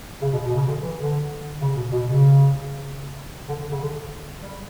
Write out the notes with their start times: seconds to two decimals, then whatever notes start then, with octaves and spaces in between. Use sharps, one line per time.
0.21 C#3
0.33 B2
0.45 B2
0.56 C#3
0.68 D3
0.83 E3
0.99 D3
1.61 C#3
1.77 B2
1.92 B2
2.07 C#3
3.48 D3
3.59 D3
3.71 C#3
3.82 D3
4.41 G3